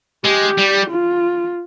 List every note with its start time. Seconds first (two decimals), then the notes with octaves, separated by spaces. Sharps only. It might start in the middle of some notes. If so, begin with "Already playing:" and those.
0.25 G#3 G4
0.58 G3
0.90 F4